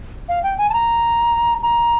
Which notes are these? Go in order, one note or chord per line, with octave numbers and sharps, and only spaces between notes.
F5
G5
G#5
A5
A#5
A#5